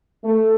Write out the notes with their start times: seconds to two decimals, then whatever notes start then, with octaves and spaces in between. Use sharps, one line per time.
0.24 A3